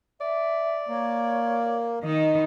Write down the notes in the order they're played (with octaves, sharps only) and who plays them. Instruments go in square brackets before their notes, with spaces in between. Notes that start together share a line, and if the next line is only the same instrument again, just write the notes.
[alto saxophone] D5 [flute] E5
[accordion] A#3 [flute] C#5
[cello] D#3 D#4